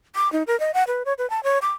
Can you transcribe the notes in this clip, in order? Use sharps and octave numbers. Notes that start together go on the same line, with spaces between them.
D6
D#4
A#4
D#5
F#5
B4
C#5
B4
A5
C#5
D6